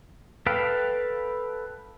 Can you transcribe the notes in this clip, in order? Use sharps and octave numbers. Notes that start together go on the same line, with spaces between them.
A4 B4 F5 G5